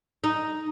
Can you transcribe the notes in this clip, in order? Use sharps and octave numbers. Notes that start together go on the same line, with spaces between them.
D#4